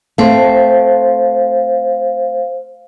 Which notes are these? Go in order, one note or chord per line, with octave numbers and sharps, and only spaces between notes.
A3 C4 C5 F5